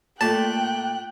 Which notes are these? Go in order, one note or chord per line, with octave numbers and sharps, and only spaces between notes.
A#2 A3 G5 A5 F#6